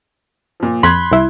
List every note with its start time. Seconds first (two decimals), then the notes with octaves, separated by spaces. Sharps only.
0.60 A#2 F3
0.83 F2 B5 C6 F#6 G#6
1.11 C2 E4